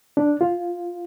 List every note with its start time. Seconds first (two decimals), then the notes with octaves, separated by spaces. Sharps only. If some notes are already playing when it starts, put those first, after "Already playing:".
0.17 D4
0.41 F4